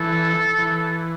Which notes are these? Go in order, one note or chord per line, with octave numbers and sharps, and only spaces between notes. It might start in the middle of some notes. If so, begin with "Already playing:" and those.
Already playing: E3 A4
E3